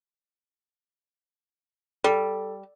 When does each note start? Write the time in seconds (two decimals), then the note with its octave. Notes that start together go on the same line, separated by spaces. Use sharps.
2.04 G3 A4